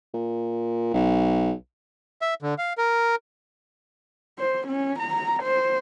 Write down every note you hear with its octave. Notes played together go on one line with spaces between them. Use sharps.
A#2
B1
E5
D3
F5
A#4
C5
C#4
A#5
C5